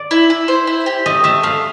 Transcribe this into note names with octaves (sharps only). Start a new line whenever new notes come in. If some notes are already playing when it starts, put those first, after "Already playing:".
Already playing: D5
E4
E4
C5
E4
G4
A3 D#5
A3 E5
A3 F5